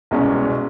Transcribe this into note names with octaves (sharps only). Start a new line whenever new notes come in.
C2 B2 G#3 C#4